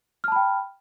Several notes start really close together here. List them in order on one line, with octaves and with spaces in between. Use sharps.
F6 A5 B5 G5